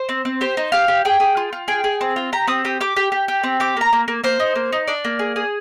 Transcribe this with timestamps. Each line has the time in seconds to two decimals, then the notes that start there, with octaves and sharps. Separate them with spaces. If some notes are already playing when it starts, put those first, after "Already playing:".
Already playing: C5
0.09 C4
0.25 C4
0.41 G4 C5
0.57 D#4
0.72 G4 F5
0.88 G4
1.05 G#4 G5
1.20 G#4
1.37 F4
1.53 F4
1.68 G#4 G5
1.84 G#4
2.01 C4
2.16 F4
2.32 G4 A#5
2.47 C4 D#6
2.65 G4 D#6
2.80 G4 D6
2.96 G4
3.12 G4
3.28 G4
3.44 C4
3.60 G4 D6
3.77 A#3 A#5
3.93 A#3
4.08 A#3
4.24 A#3 C5
4.40 D#4
4.55 A#3
4.72 D#4
4.87 D4 D5
5.04 A#3
5.19 G#4
5.36 G#4